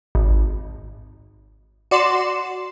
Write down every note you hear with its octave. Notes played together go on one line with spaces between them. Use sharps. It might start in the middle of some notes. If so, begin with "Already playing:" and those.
G#1
F#4 D5 C6 E7